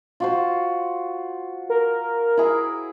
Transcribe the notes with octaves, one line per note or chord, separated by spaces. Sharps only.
F4 F#4 C5
A#4
E4 G#4